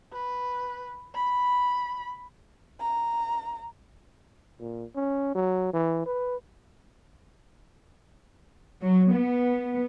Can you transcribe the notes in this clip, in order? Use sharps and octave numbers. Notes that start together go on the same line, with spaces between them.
B4
B5
A#5
A#2
C#4
F#3
E3
B4
F#3
B3